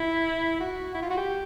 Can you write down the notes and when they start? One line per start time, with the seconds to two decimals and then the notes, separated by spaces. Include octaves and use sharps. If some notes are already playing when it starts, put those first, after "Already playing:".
Already playing: E4
0.60 F#4
0.94 E4
1.02 F4
1.10 F#4
1.17 G4